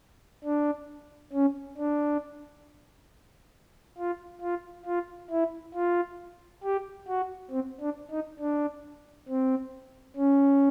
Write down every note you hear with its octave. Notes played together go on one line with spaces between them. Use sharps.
D4
C#4
D4
F4
F4
F4
E4
F4
G4
F#4
C4
D4
D#4
D4
C4
C#4